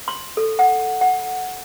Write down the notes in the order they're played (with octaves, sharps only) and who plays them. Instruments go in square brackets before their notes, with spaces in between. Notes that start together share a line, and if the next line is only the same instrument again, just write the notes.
[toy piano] C6
A4
F#5
F#5